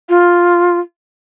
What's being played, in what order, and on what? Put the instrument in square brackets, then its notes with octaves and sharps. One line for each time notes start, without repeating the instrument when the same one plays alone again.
[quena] F4